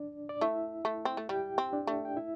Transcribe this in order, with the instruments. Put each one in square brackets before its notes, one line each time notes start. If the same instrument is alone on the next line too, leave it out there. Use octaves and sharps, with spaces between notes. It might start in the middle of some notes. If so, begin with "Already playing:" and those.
Already playing: [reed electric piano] D4 D5
D5
[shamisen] A3 [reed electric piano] E4 E5
[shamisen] A3
C4
A3
[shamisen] G3 [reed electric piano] G4 G5
[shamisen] C4
[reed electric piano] D4 D5
[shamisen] A3
[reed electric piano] G5
E4 E5